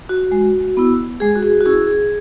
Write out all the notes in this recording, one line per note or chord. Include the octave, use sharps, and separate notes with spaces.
F#4
G#3
B3 E4
G#3 G#4
F#4
G#4
F#4
C#4 E4 G#4
G#4